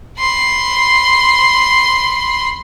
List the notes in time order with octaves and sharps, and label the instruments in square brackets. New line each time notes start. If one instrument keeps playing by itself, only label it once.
[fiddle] B5 C6